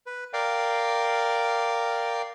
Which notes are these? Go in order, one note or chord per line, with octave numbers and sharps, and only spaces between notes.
B4
A#4 D5 F5 G5